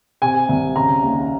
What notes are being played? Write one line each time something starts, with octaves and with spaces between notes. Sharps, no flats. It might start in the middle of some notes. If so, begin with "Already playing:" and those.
C3 G#5
C2
C#3 A#5
D#2